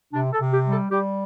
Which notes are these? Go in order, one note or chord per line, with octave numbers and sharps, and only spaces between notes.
C3 D4
A4
C3
G4
G3
A4
G3 G4